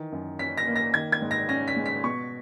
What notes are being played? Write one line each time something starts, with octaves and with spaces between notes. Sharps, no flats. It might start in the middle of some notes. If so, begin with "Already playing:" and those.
Already playing: D#3 E3
F#2
C#4 B6
A#6
A#3
A#6
D#3 G#6
G#6
G#2
A#6
C#4 A#6
B6
G#3
B6
B2 C#6